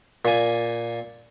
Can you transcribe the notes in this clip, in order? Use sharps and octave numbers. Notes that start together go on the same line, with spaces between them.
A#2 G#5